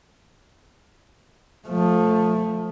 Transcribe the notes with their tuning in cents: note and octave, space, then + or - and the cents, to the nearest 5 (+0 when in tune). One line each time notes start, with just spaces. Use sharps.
F3 +20 A3 +0